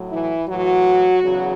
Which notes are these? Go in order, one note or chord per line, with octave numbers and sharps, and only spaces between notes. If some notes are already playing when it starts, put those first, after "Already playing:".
Already playing: A2 F#3
E3 E4
A2 E3 F#3 F#4
E2 C#3 F#3